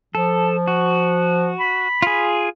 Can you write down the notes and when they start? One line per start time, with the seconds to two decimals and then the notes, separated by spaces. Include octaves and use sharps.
0.15 F3 A4
0.67 F#4
1.60 B5
2.02 F4 G#4